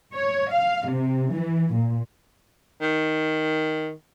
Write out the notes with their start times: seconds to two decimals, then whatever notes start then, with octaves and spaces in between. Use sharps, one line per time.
0.16 C#5
0.52 F5
0.88 C3
1.32 E3
1.74 A#2
2.81 D#3